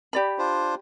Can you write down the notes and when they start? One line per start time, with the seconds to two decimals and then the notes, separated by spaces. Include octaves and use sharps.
0.13 G4 D5 B5
0.39 D4 F4 C5